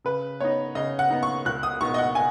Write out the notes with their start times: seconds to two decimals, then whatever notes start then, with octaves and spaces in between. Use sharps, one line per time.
0.05 C#3 B4
0.40 B3 D#4 C#5
0.75 C#3 D#5
0.99 F#5
1.10 B3 D#4
1.23 C#6
1.45 C#2 F#6
1.63 D#6
1.81 B2 B3 D#4 C#6
1.94 D#5
1.98 F#5
2.15 G#5